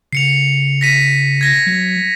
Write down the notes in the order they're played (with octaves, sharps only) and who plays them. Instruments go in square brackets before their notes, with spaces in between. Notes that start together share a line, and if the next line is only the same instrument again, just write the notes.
[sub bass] C#3 [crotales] C7 C#7 F7
[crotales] A#6 B6 D#7
G#6 A#6 D#7
[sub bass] F#3